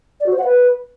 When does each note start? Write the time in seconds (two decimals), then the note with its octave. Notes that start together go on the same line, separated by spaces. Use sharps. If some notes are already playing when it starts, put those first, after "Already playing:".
0.20 D5
0.26 F#4
0.32 C5
0.38 F#5
0.44 B4